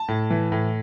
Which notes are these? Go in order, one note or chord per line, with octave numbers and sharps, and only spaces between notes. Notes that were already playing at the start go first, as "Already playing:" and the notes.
Already playing: A5
A2
E3
A2